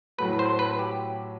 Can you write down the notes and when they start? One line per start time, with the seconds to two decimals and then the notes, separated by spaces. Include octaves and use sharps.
0.18 A2 F#3 A3 B4
0.39 C5
0.59 B4
0.79 G4